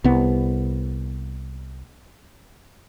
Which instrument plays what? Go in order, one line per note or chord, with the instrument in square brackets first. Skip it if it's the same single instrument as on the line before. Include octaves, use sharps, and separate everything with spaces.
[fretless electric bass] C2 B3